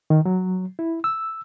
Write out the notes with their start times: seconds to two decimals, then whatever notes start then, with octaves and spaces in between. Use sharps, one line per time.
0.10 D#3
0.25 F#3
0.79 E4
1.04 E6